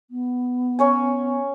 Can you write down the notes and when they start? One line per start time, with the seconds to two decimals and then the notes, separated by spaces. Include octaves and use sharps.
0.11 B3
0.79 C#4 C#5 G#5